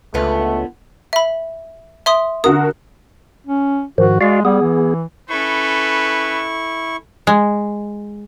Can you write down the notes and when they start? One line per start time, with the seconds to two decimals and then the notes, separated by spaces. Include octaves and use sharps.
0.14 C#2 D3 A3 B3 F4
1.13 E5 B5
2.06 E5 C6 D#6
2.44 D3 F#4 A#4 D#6
3.47 C#4
3.98 G#2 D#3 F3 F#4
4.21 G#3 F#4 D5 F5
4.45 G3 B3 G#4
4.62 E3
5.30 C#4 E4 A4 B4 C#6
7.27 G#3